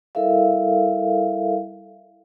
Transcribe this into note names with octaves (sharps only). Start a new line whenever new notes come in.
G3 E4 A4 A#4 E5 F5